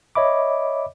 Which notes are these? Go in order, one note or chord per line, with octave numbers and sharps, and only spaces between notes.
C#5 D#5 E5 B5 D6